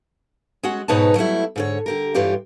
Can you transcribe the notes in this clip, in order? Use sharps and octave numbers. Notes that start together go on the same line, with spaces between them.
G#3 C#4 F#4 F#5
G#2 B2 D#4 B4 C#5 A5
F#3 G3 A3 E4
G#2 D3 C#5
D3 G4 A#4
G2 E3 F4 G4 C#5